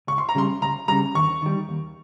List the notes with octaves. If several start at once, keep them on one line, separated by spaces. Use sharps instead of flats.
C#2 C#6
C6
A#5
C#3 G3 C6
C#2 A#5
C#3 G3 A#5
D#2 C#6
D#3 G3
D#2